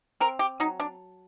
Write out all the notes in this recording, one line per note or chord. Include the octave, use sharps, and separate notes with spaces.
C4 A#4
G4
F#3 D#4
D4